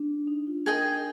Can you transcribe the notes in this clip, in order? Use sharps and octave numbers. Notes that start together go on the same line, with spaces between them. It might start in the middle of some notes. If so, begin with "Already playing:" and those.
Already playing: D4
D#4
F4
G#4 A#4 D#5 G5